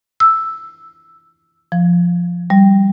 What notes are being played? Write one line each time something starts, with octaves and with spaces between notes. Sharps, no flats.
E6
F3
G3